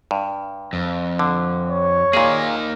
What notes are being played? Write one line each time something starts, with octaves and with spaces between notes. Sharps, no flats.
G2
F2
D3
C#5
A#2 A#3 D#4 G#4